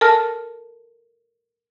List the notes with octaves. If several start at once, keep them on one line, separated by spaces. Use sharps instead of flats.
A4 A#4 A5 F6